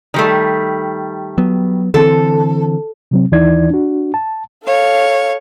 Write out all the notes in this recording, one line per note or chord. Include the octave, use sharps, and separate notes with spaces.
D#3 G3 A3
F#3 B3
D3 E3 C4 A4
C3 F#3 C4
D#2 E3 D#4 E4 D5 G#6
D4 F#4
A5
A4 C#5 F5